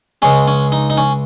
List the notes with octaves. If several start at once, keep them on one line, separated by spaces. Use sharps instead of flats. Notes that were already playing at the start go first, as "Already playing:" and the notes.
C#2 C#3 G#3 C#4
C#4
D#4
D#4
C#4